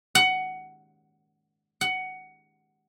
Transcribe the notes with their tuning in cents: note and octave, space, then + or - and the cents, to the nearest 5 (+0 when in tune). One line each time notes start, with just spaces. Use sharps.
F#5 +15
F#5 +15